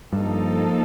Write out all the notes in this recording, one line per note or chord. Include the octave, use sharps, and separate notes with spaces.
G2 F3 A#3 D#4 A4